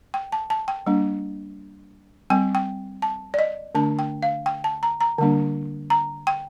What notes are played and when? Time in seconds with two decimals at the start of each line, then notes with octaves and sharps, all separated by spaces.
0.14 G5
0.32 A5
0.50 A5
0.68 G5
0.87 G3 A#3 D4
2.30 G3 C4 G5
2.55 G5
3.02 A5
3.34 D5
3.39 D#5
3.75 D3 A3 D4 A5
3.99 G5
4.23 F5
4.46 G5
4.64 A5
4.83 A#5
5.01 A#5
5.18 D3 G3 A#3 D4
5.90 A#5
6.27 G5